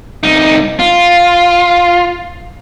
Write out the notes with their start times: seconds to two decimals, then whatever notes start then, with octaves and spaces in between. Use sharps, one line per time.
0.23 C2 D#4
0.79 F4